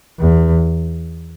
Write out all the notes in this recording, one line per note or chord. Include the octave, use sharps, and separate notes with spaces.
E2